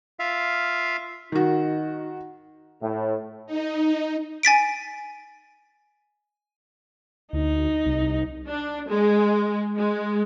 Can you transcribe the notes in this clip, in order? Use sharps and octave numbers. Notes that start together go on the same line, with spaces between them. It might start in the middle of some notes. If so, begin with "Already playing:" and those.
F4 E5 F5
D#3 D#4 F#4
A2
D#4
G#5 A6 B6 D7
D2 D#4
C2
D4
G#3
G#3